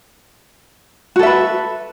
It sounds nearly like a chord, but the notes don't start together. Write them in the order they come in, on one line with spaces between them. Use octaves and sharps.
F#4 A4 E5 B4